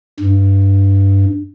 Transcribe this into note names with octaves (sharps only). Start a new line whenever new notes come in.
G2